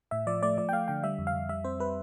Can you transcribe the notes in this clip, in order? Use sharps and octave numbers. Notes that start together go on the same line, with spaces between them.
A2 E5
F3 D5
A3 D5
F3 D5
G5
A3 F5
D3 G5
G3 E5
F2
F5
F2
G3 E5
C4 C5
G3 B4